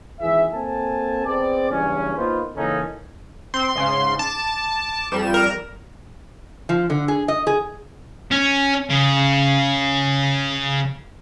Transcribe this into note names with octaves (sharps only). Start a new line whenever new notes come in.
G#1 E3 G#4 E5
A#3 C4 A4 G#5 A5
B3 C4 G#4 D5
F#1 E2 G2 C#4
A#3 B3 D#4 F4 B4 C5
C#3 E3 A#3 C#4 D#4 A4
C4 C6
G#2 C#3
A5 D6
F2 G3 E7
A#4
F3
D3
G#4
D#5
G#4
C#4
C#3